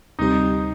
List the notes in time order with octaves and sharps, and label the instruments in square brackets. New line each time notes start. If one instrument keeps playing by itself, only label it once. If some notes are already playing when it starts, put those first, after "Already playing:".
[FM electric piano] D2 C3 G3 C4 G4 [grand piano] D#4